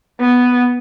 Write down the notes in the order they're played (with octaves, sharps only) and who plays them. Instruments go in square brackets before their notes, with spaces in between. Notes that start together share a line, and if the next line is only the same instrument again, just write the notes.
[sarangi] B3